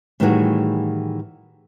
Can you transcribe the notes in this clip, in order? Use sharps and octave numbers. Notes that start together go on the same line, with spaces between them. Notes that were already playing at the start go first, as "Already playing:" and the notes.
A2 D#3 E3 G3 F#4 G#4